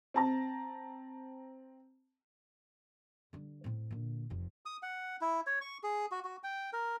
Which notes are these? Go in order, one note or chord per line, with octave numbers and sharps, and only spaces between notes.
C4 A5 A#5
D3 G3
A2 C4
A#2 D3
F1 F2
D#6
F#5
E4
C#5
C#6
G#4
F#4
F#4
G5
A#4